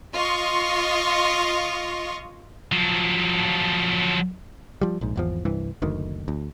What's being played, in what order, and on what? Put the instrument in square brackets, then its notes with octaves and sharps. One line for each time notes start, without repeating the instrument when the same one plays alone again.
[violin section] F4 D#5 C6 C#6
[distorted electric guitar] F3 F#3
[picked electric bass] F3 G3
A#1 G#2
G#1 E2 F3
C2 G2 E3
F#1 D2 D#3
D2